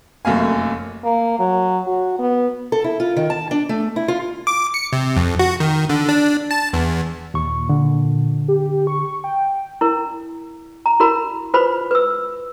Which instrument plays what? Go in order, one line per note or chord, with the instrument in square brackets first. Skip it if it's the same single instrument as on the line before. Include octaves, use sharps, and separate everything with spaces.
[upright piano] F1 F#2 A3 A#3 F5 G#5
[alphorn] A#3
F#3
F#4
B3
[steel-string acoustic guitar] A4
E4
F4
D#3
A5
D4
A3
E4
F4
[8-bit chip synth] D6
C#7
C3
F2
F#4
D#3
D3
D4
A5
E2
[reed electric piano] D#2 C#6 [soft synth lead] A#2
[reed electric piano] D3
[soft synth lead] G4
C#6
G5
[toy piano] E4 A#4
A#5
E4 F#4 A#4 B5
F4 B4 C5 B5
B4 E6